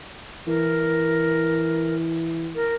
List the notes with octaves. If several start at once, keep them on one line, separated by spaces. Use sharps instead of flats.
E3 A#4
A#4